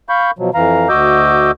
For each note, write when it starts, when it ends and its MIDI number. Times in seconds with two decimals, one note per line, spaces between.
0.09 0.31 77
0.09 0.31 83
0.09 0.31 85
0.09 0.31 91
0.39 0.50 47
0.39 0.50 53
0.39 0.50 54
0.54 0.88 41
0.54 0.88 52
0.54 0.88 77
0.54 0.88 82
0.89 1.51 38
0.89 1.51 66
0.89 1.51 75
0.89 1.51 86
0.89 1.51 88
0.89 1.51 91